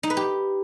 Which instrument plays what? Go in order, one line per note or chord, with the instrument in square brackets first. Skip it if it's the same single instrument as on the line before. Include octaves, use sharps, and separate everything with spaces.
[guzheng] D#4
B4
G4